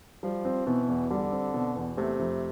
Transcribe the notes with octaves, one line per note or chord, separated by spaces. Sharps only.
F3 G3
C4
B2 E3
E2
D3 G3
C4
B2
E2
C3 A3
F2